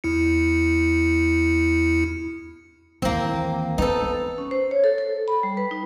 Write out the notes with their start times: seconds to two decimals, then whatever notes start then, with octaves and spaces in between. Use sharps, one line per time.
0.04 E2 E4 C#7
3.02 D#2 E3 A#3 C4
3.78 B3 D#4 A4 B4
4.38 C#4
4.51 C5
4.71 C#5
4.84 A4
4.98 A4
5.28 B5
5.43 G3
5.57 B4
5.71 D#4